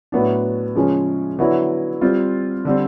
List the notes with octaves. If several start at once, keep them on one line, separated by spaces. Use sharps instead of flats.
A2 F#3 B3 D4
C#3 F3 G#3 C#4
D3 F#3 B3 E4
G3 C4 F4
D3 G3 C4